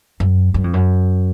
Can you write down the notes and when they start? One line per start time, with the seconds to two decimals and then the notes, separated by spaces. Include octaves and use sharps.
0.20 F#2
0.54 F#2
0.64 F2
0.74 F#2